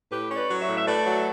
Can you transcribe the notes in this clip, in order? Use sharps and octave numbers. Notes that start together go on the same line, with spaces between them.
A2 G4 B4
C#4
B4 D5
F#3
C#5 E5
A2
E5
A3 B4 D5
F#3